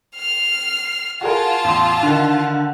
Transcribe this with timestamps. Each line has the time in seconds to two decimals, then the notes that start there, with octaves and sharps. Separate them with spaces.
0.16 F6 C7
1.21 F4 F#4 G#4 A#4 A5
1.64 A1 E2 C6
2.03 D3 D#3